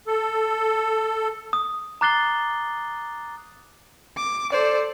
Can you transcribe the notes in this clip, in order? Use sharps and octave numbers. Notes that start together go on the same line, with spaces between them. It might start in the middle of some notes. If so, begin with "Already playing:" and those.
A4
D#6
A#5 D6 F#6 A6 C7 G7
D6
A4 C5 D5